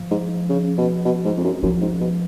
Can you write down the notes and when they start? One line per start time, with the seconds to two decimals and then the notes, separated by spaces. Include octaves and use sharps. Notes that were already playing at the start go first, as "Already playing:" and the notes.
Already playing: F3
0.11 G#2
0.49 C#3
0.78 B2
1.05 B2
1.25 G#2
1.37 F2
1.44 F#2
1.63 F#2 F3
1.81 G#2
2.01 B2